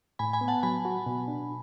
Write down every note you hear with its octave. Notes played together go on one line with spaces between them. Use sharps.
A2 G#5 B5
G#5 B5
B3
F#5 A5
F#3 G#5 B5
F#4
B2
D4